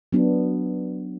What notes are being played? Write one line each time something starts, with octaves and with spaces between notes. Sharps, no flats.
F#3 B3 D4